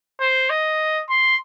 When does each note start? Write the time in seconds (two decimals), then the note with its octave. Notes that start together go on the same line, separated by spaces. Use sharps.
0.21 C5
0.50 D#5
1.10 C6